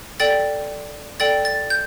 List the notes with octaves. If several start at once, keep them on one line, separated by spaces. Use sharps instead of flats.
A4 D5 G5 A6
A4 D5 G5 A6
A6
G6